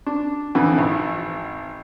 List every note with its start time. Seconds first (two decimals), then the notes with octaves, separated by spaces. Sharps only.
0.06 D4
0.55 F2 D3 E3
0.78 G#1